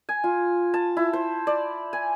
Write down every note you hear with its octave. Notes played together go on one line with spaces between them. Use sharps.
G#5
F4
A5
E4
C5
D5
G#5